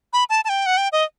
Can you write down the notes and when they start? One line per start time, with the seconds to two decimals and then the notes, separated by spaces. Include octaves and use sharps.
0.13 B5
0.30 A5
0.45 A5
0.49 G5
0.66 F#5
0.77 G5
0.92 D#5